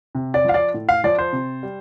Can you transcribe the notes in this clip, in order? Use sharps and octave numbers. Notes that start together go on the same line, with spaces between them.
C3
D5
F3 F5
D5
A2
F5
F3 D5
C5
C3
G3